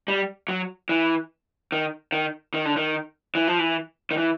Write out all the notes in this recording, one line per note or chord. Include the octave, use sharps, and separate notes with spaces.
G3
F#3
E3
D#3
D#3
D#3
D3
D#3
E3
F3
E3
D#3
E3